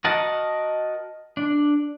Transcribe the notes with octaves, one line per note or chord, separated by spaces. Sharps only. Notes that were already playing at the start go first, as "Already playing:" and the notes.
F#4 A#4 D#5 F#5 A5
D4